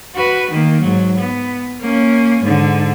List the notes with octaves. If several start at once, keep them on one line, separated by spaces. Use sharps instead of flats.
F#4 B4
D#3 A#3
G#2 F#3
B3
A#3 C#4
G#2 D3